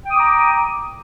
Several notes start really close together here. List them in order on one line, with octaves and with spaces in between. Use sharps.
G5 D#6 D6 A#5